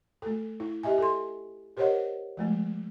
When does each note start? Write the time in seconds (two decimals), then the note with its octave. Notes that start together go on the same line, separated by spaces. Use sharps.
0.22 A3 A4
0.60 E4
0.83 G4 D#5 E5 G#5
0.98 A4 C6
1.77 G4 A#4 C5 C#5 D#5 F#5
2.37 F3 G#3 A3